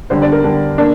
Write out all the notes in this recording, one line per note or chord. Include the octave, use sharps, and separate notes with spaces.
D3 G3 D4 C5
D5
A#4
D3 G3 D4
A#3 D4